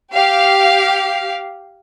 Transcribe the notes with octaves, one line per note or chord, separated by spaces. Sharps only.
G4 F5